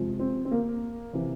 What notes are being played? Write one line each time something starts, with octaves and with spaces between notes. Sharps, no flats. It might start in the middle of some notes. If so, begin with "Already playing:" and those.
Already playing: F2 C3 F3 G#3
C4
C4
A#3
C3 E3